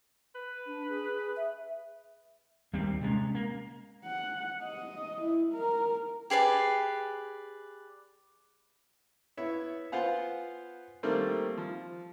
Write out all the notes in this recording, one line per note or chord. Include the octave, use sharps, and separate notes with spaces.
B4
D4
G#4
E5
D#2 G3 A#3 C4
C3 G#3 A#3 C#4
A#3
F#5
D#5
E4
A#4
G4 G#4 B4 D5
B3 E4 C#5 E5
B3 F4 C5 F5 F#5 G#5
D#3 G3 A3 A#3 C4
F3